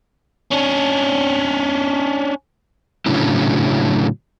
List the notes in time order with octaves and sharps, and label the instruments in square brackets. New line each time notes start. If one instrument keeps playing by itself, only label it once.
[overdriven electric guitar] C#4 D4
[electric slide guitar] A2 C#3 F#3 C#4 D4 E4